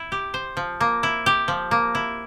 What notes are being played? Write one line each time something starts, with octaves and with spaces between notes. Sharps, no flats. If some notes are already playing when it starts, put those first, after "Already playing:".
Already playing: E4
G4
C5
F3
A#3
E4
G4
F3
A#3
E4